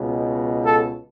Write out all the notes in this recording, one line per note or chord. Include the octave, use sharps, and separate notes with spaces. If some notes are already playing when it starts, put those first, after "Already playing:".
Already playing: C#2 B2
A4